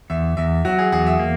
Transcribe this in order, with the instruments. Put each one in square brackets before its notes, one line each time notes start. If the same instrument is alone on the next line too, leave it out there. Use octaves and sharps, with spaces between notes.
[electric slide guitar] E2 [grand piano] E5
[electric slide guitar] E2 [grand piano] E5
[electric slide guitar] F#3 [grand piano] F#4
[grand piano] G#4
[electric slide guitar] E2 [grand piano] G#4
[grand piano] E5
[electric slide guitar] A#3